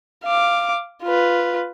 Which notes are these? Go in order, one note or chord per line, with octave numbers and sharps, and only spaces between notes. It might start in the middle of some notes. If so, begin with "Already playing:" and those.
F5 D6
F4 B4